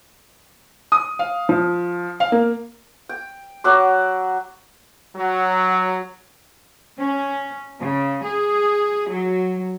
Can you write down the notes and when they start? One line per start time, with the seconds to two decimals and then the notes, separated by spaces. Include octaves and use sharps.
0.92 D#6
1.19 F5
1.49 F3
2.20 F5
2.32 A#3
3.09 G5
3.64 F#3 F#5 D6
5.16 F#3
6.99 C#4
7.79 C#3
8.23 G#4
9.09 F#3